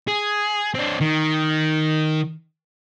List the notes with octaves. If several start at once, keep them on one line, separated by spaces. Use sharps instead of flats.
G#4
C4 D4
D#3